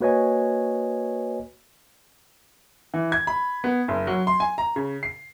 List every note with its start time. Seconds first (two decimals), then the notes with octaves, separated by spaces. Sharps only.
0.01 A#3 F#4 B4 C#5 D#5 G#5
2.94 E3
3.12 G#6
3.27 B5
3.64 B3
3.88 F#1
4.07 F#3
4.27 C6
4.40 G#5
4.58 A#5
4.76 C#3
5.03 C7